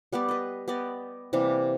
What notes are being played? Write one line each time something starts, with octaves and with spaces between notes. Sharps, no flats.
G3 B3 G4 D5
B4 D#5
B3 G4 D5 D#5
C3 E3 G3 A#3